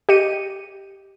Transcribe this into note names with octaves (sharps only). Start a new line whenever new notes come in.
G4 D#5 C#7 D#7